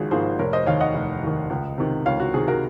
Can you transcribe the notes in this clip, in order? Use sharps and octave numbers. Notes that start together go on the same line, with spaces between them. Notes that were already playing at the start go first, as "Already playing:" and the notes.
Already playing: G#1 G#2 F3 F#4 G#4
G#2 F3 A#3 G#4 C5
F1 A#4 C#5
C5 D#5
D#2 D#3 C#5 F5
D#5 F#5
F1
D#2 D#3
C#2
C3 D#3
C#2 C#5 F5
F#4
C3 D#3 G#4
F#4 A#4